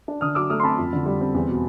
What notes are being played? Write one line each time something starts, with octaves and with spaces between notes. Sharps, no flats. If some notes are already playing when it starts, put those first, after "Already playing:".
D4
D3 D#6 F6
F#3 D6 E6
A3 D#6 F6
C6
C4 A5 B5
F2
D3
G3
C4
E2
B2